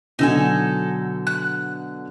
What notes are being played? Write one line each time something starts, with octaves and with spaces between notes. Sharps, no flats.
B2 D3 F#3 D#4 A4 G#5
F#6